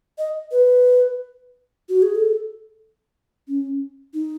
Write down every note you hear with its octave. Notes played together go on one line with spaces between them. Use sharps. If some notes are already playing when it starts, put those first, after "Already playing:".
D#5
B4
F#4
G#4
A4
C#4
D#4